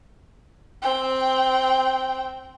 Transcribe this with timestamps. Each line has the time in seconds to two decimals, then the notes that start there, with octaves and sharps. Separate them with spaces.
0.82 C4 G5